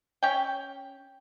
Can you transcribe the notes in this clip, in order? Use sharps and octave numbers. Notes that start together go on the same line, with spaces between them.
C#4 G5